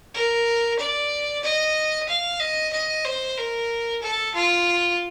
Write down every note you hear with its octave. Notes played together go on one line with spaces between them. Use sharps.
A#4
D5
D#5
F5
D#5
D#5
C5
A#4
A4
F4